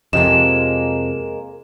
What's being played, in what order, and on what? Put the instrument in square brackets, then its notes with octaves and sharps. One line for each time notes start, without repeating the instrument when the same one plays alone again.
[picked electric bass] F2 C3 F3 [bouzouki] G#3 A#3 [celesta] E7